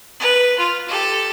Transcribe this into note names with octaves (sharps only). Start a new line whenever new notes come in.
B4
F4
G4 A4